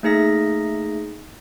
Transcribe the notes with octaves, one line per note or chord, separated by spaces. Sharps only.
A3 A#3 D#4 G#4 E5 A#6